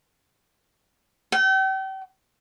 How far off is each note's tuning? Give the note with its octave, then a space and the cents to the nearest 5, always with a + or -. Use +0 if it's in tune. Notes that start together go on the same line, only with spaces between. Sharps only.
G5 -40